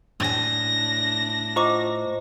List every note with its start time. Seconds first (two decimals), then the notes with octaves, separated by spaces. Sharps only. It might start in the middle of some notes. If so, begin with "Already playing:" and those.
0.20 A2 D4 G#5 A#6
1.56 F4 C5 D#5 A#5 C#6 D6